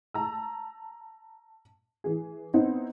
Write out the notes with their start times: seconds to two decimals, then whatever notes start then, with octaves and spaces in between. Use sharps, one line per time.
0.14 A5 A#5 E6
2.04 E3 G#4
2.54 B3 C4 D#4 E4 C5